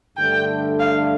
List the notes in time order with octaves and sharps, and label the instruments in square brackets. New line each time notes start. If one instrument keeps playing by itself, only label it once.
[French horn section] G2 D3 A3 [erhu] G5
[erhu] F5